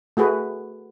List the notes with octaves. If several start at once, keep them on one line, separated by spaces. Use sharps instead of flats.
A3 F#4 G#4 B4